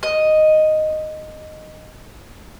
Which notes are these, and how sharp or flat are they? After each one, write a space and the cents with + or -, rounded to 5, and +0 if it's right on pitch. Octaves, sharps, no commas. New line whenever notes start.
D#5 -5